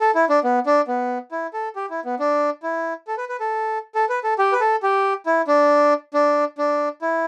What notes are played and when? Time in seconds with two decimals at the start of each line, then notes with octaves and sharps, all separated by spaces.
0.01 A4
0.15 E4
0.29 D4
0.44 B3
0.66 D4
0.88 B3
1.32 E4
1.53 A4
1.76 G4
1.90 E4
2.05 B3
2.19 D4
2.63 E4
3.07 A4
3.18 B4
3.29 B4
3.40 A4
3.95 A4
4.09 B4
4.24 A4
4.39 G4
4.52 B4
4.61 A4
4.83 G4
5.26 E4
5.48 D4
6.14 D4
6.58 D4
7.02 E4